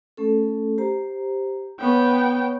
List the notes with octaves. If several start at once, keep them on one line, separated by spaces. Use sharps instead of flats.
A3 C#4 A4
G4 C5 A#5
B3 C#5 G5 C#6